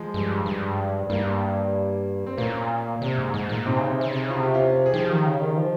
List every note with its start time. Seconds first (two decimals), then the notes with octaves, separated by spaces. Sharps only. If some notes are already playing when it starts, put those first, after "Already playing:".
Already playing: F3 G#3
0.14 G2
0.46 G2
1.10 G2 G3 A#3
2.26 C4
2.37 A#2 A#3 C#4
3.02 C3
3.18 G#2
3.34 G#2
3.49 A#2
3.65 C3 C4 D#4
3.77 C#3
3.90 C3
4.01 C#3
4.13 C3
4.23 C#3
4.30 F4
4.35 C3
4.42 G4
4.54 C#4 F4
4.86 G#4
4.94 F3 D#4 G4
5.09 D#3
5.26 C#3
5.41 D#3
5.57 F3